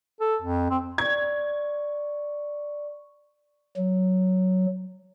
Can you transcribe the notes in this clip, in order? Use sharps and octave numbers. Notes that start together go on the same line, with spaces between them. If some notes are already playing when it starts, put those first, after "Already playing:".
A4
F2
C4
D5 C#6 G#6
F#3